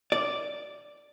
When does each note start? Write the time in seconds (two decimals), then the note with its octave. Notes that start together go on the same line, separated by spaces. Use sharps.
0.12 D5